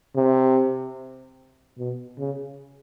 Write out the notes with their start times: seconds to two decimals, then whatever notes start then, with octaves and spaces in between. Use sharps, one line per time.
0.17 C3
1.78 B2
2.19 C#3